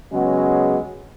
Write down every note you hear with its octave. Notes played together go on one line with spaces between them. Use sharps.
C#3 F#3 G#3 B3